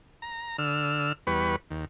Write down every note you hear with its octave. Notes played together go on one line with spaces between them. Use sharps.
A#5
D3 E6 F6
E2 G3 B3 B4 C#6
D#2